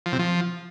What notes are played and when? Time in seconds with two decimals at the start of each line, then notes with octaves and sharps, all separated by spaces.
0.06 F3
0.13 C3
0.19 F3